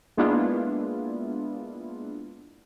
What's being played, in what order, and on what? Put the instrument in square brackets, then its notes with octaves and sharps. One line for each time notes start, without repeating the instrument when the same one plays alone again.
[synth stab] G#3 A#3 B3 D4 E4 F4